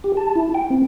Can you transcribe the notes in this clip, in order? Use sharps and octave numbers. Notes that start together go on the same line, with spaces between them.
G4
A5
E4
G5
C4